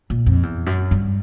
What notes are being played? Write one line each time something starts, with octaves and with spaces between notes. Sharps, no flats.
A#2
F2
E2
F#2
G2